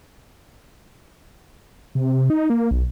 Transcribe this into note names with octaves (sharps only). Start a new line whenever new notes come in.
C3
C3
D#4
A#3
B1